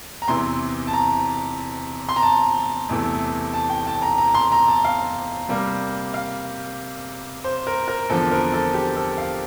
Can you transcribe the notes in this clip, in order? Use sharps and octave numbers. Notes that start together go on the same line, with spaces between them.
A#5
E2 C3 E3 C6
A5
A#5
C6
A#5
A5
E2 C3 E3 A3
A5
G5
A5
A#5
A#5
C6
A#5
A5
F5
C3 G3 A#3
F5
C5
A#4
A#4
E2 D3 F3 C4 A4
A#4
A4
G4
A4
F5